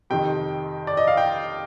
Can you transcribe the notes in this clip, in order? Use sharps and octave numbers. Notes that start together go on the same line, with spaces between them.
F2 C3 D#3 G5
D5
D#5
F5
G5